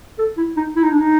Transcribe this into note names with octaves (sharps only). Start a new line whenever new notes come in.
A4
E4
D#4
E4
D#4
D4
D#4